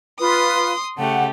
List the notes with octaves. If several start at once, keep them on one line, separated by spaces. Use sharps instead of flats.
F4 B4 C6 D#6
C#3 A3 G4 F#5